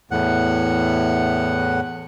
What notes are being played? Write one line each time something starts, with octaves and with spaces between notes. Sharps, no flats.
E2 A2 F#5